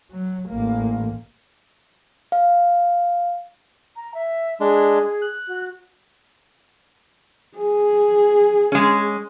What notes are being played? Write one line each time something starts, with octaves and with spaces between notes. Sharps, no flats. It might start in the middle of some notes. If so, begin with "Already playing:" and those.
F#3
A1 A#3
F5
A#5
E5
G#3 D4 G#4
F#6
F#4
G#4
G#3 C#4